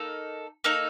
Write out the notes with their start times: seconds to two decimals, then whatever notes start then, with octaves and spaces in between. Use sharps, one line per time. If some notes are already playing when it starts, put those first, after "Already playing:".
Already playing: A#3 D#4 A4
0.64 A#3 D#4 A4